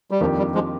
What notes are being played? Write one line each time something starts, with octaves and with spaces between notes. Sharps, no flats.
G3
F2 D#3 F3 A#3 D4 G4
G3
F3 G#3